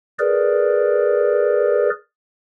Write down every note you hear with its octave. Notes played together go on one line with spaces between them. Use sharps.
G#4 A#4 B4 D5